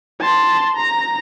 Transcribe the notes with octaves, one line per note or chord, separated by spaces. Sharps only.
A5 C6
A#5